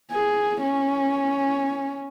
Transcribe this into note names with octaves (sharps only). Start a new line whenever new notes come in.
G#4
C#4